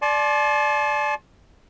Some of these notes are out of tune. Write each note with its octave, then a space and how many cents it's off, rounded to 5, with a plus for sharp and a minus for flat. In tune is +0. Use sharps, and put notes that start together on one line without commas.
D5 +0 A5 -40 C6 +30